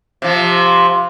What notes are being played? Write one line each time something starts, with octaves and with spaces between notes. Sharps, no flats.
C3 F3